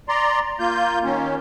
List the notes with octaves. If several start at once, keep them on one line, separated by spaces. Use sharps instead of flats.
D5 A#5 C6
A#3 F4 G6
D#3 A#3 C#4